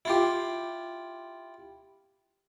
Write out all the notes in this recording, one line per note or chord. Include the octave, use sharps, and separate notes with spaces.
E4 F4 G4